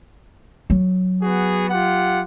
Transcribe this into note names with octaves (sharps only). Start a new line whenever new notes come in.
F#3
B3 F#4 G#4
F4 G4 F#5